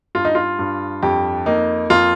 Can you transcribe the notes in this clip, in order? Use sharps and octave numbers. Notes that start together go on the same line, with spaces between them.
G2 F4
D#4
F4
G2
F2 G4
A#3 D#4
F2 F4